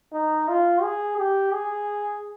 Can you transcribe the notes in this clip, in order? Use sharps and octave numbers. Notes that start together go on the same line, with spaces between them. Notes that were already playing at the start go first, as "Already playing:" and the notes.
D#4
F4
G#4
G4
G#4